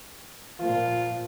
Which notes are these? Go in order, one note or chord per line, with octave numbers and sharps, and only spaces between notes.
A#2 F3 F4